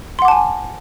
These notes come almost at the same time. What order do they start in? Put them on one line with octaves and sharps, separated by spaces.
C6 F#5 D6 A5 G#5